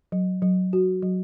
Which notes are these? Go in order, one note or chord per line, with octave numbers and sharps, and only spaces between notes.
F#3
F#3
F#4
F#3